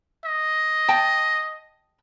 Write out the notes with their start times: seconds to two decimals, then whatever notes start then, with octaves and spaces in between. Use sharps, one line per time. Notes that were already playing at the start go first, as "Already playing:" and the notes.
0.25 D#5
0.88 G5 A5